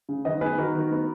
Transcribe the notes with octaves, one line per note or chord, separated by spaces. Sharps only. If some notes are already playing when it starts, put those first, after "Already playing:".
C#3
D#3 B4 D#5
B3 G#4 B4
D#3 F#4 A#4
D#3
B3